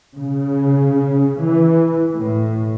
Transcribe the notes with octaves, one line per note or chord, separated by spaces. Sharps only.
C#3
E3
A2